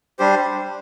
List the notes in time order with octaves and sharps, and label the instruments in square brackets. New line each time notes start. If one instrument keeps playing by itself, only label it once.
[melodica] G3 D4 G4 C5